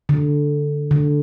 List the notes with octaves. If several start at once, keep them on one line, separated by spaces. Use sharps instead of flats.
D3
D3